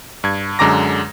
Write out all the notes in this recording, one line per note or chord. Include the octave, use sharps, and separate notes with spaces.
G2 G#6
F#2 D3 G#3 A#5 D6 A#6